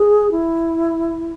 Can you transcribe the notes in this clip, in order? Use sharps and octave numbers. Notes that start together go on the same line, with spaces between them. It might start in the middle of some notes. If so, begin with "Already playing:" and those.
Already playing: G#4
E4